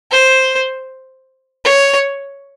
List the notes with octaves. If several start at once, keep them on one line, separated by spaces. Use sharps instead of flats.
C5
C#5